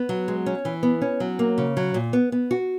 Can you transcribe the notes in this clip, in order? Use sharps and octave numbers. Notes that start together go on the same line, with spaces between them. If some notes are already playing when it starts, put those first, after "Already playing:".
Already playing: B3
F#3
G#3
C#4
E3
B3
C#4
F#3
A#3
C#3
F#3
A#2
B3
B3
F#4